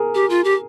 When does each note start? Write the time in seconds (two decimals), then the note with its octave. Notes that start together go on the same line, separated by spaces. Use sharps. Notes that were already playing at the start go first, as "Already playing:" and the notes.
Already playing: G#4 A#4
0.15 G4
0.30 F4
0.44 G4